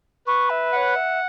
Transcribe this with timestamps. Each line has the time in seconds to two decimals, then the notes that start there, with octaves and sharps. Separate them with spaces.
0.27 B4 C#6
0.50 E5
0.73 E5 F#5
0.76 C#5
0.96 E5